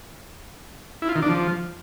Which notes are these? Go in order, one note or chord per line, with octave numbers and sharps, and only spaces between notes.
E4
F4
D#3
D4
F3